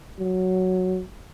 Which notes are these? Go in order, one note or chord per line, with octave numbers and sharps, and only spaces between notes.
F#3